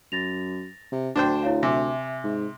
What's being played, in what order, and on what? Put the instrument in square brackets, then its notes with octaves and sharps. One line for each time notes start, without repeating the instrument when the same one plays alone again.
[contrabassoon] F#2 [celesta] A6 A#6 F7
[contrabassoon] C3
[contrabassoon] D2 [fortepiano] D4 C5 G5
[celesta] E4 C#5 F5
[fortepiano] C3 [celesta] E5 G#5 D6
[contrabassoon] G#2